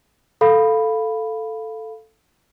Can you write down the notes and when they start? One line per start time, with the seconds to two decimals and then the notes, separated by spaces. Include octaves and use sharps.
0.41 A4 F5 B5